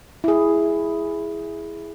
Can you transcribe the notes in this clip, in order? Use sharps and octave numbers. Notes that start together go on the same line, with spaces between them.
E4 G#4